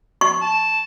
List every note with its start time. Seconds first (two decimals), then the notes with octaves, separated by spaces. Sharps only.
0.21 C#6
0.42 A5